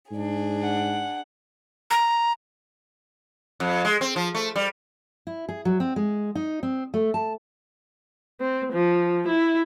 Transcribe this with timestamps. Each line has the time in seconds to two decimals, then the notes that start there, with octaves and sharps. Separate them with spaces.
0.12 G#2 D4 G#4
0.63 F#5
1.91 A#5
3.60 F2
3.85 G#3
4.01 C4
4.16 F3
4.35 A3
4.56 G3
5.27 E4
5.49 G#4
5.65 F#3
5.80 C4
5.96 G#3
6.35 D#4
6.63 C4
6.94 A3
7.14 A5
8.41 C4
8.73 F3
9.28 E4